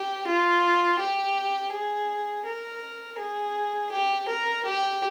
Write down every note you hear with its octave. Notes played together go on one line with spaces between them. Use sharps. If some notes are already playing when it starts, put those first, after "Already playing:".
Already playing: G4
F4
G4
G#4
A#4
G#4
G4
A#4
G4